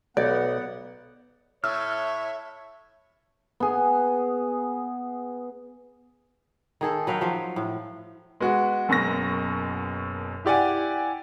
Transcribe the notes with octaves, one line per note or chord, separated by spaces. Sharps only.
B1 B3 D5 F#5
A2 C#5 E5 E6 F6
B3 G#4
D#3 G#4 A4
F#3 B4 F5 G5
F3 F#3
A2
G#3 B3 F#4
F#1 F#2 B2 C#6 A#6
E4 G4 D5 F#5 G#5